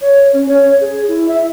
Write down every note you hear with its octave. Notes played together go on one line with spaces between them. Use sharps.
C#5
C#4
C#5
G#4
E4
E5